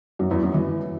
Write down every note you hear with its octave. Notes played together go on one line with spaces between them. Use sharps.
F#2
E2
F#2
E3